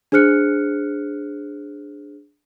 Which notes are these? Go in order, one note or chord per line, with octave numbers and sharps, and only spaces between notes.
D4 G#4 C5 F6 F#6 C#7